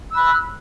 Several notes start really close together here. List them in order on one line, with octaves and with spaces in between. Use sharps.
E6 F#6 B5